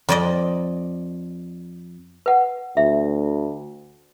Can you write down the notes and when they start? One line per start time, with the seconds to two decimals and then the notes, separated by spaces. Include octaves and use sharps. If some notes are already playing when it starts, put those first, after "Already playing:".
0.09 F2 D5 D#5
2.26 B4 F#5
2.77 D2 E5